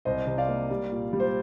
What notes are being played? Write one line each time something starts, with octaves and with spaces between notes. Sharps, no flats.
C2 C5 D#5
C3
D5 F5
A#3
G3
A#2
G3
C5